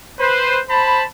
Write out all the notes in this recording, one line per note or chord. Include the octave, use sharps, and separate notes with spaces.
B4 C5
C5 A5 B5